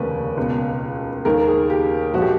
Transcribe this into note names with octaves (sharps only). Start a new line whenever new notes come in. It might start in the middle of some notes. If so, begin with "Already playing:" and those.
Already playing: F1 D#2 C#3 B4
C#2 B2
D#2 D#3 A#4
G#4
G4
A#1 A#2 F3 F#4
G4